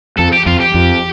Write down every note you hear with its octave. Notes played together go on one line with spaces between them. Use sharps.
F2 A4
G4
F2 F4
G4
F2